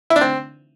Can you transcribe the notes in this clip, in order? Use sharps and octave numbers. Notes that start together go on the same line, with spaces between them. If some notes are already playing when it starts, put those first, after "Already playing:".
E4
D4
C4